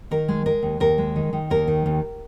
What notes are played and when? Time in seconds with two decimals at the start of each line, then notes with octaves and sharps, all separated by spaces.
0.11 D#3 A#4
0.28 G#3
0.46 G#3 A#4
0.63 D#2
0.80 D#2 A#4
0.98 G#3
1.16 D#3
1.33 D#3
1.50 D#2 A#4
1.68 D#3
1.86 D#2